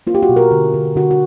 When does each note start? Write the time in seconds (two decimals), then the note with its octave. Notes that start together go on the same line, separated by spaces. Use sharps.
0.07 A#3 F4
0.15 G4
0.23 F#4
0.29 B2
0.36 A#4
0.51 D3
0.74 D3
0.96 D3 F#4
1.11 F#4